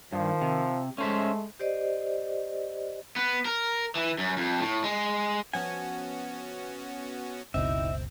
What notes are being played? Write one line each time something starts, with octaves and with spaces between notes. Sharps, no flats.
G2 D#3 F3
C3
G#3 A3 C#4 C5 E5
G4 C5 D5 D#5
B3
A#4
E3
F#2
F2
A2
G#3
F3 B3 C#4 F#4 F#5 G#5
F#1 C#2 B2 C4 D#4 E4 E5